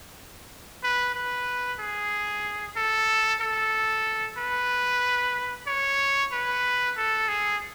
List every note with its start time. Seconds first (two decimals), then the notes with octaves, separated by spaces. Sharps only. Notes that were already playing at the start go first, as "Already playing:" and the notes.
0.83 B4
1.15 B4
1.80 G#4
2.76 A4
3.41 A4
4.38 B4
5.67 C#5
6.32 B4
6.97 A4
7.29 G#4